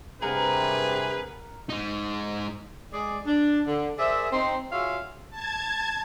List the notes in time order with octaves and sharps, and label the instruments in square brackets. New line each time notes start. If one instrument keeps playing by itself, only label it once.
[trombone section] G2 C3 [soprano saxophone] G#4 [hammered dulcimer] A#4 F#5 A#5 [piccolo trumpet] B4
[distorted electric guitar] G#3 D#4
[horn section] G#3 G#4 D5
D4
D3
G#4 A#4 C5 D5 E5
C4 D#4 C6
F4 F#4 G#4 C#5 E5 F5
[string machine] A5 G#6